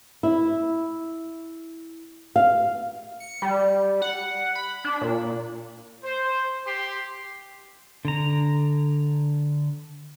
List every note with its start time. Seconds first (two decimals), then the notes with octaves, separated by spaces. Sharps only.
0.23 E4
2.36 F5
3.20 C#7
3.42 G3
4.02 F#5
4.55 B5
4.85 D4
5.01 A#2
6.04 C5
6.67 G4 C6
8.05 D3 A#5